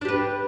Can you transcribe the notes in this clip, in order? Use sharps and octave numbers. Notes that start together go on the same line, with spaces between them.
D4 G4 B4